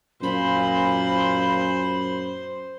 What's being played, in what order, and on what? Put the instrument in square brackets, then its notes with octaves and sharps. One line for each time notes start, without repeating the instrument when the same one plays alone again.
[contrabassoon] F#2 [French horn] A#2 [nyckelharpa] C5 [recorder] B5